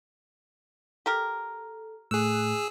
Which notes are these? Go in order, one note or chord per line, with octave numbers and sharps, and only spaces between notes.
G4 A4 A#4
A2 A3 G#4 E6 F#6